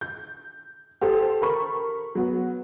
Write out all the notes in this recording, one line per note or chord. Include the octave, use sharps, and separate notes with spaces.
G6
G4 A4 C5
A#4 B5 C#6
F#3 B3